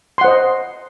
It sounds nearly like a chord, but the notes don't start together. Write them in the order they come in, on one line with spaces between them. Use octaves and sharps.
C6 F#5 C5 D#5